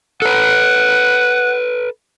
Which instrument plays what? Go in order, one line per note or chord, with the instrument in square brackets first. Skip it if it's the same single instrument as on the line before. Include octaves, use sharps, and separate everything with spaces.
[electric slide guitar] A4 B4 [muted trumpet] F#5